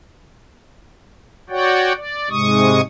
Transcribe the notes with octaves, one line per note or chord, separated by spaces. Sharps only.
F#4 C#5 D5 F#5 G5
D5
G#2 C3 G#3 C#6 D#6